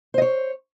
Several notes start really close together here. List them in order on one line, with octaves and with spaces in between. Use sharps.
C5 D#5 C#5